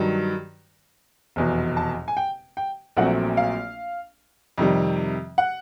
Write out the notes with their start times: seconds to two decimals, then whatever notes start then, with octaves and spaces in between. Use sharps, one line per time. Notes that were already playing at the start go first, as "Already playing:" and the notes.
Already playing: G2 D#3 F#3
1.36 F1 E2 B2
1.77 A5
2.08 G#5
2.17 G5
2.57 G5
2.97 A#1 A#2 F#3 A3 C4 F#5
3.37 F5
4.58 F2 C3 D#3 G3
5.38 F#5